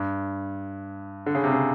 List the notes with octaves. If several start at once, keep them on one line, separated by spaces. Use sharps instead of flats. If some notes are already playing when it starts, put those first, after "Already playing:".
Already playing: G2
D3
C#3
C3
C#3